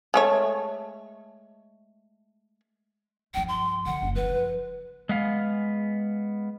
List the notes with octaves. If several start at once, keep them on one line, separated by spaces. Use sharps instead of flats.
G#3 A3 C#5
G2 F3 G5
C6
D3 F#5
F#1 E4
F3 E4 B4
G#3 B3 F5